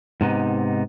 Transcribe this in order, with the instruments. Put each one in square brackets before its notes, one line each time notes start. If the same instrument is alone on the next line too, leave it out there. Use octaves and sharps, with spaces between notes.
[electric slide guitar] G#2 C3 B3 D#4